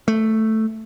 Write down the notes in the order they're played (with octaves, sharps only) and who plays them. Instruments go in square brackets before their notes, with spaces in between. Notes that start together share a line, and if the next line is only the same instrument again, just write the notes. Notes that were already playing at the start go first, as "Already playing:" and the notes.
[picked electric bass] A3